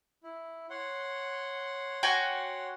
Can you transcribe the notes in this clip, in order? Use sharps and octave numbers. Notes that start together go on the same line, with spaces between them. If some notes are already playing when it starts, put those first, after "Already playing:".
E4
C#5 F#5 C6
F#4 G5 G#5